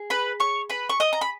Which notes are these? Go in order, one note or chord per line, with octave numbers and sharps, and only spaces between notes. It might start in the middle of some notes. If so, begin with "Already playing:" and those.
Already playing: G#4
B4 B5
C#5 C#6
B4 B5
C#6
D#5 D#6
A#5
B5